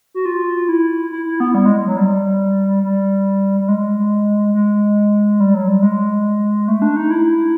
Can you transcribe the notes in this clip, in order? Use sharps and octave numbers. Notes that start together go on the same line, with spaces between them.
F#4
F4
E4
E4
E4
B3
G3
G#3
F#3
G3
G3
G3
G#3
G#3
G3
F#3
G3
G#3
A3
D4
D#4
E4